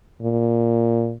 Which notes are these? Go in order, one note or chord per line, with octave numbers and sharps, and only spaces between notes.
A#2